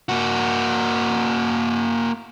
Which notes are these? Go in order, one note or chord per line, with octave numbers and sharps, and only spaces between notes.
A#3 F#4